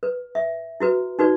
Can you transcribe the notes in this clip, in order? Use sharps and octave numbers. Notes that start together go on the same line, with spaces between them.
B4
E5
E4 F#4 B4
D#4 F#4 B4 D5